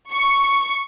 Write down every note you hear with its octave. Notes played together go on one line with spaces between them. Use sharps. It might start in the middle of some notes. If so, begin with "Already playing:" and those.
C#6